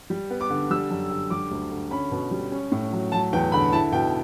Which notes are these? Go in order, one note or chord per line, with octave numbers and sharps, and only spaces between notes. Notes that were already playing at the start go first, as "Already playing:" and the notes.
G3
B3
D6
D3
G3 E6
F#2
D3
G3 D6
D2
D3
C#4 B5
B2
G3
C#4
A2
F#3
F#3 A5
E2 G5
D3 B5
E4 A5
B2 G5